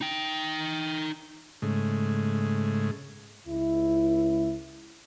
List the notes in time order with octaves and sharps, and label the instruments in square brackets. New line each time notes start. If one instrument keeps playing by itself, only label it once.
[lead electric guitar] D#4 G5
[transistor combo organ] G#2 C#3 G#3 A3
[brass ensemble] C#2 E4